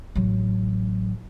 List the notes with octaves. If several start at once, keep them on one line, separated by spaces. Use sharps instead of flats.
A1 F#3